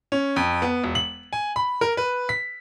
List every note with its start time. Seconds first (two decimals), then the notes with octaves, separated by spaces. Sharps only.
0.12 C#4
0.36 F2
0.62 B3
0.84 E1
0.95 F#7
1.33 G#5
1.56 B5
1.81 A#4
1.97 B4
2.29 B6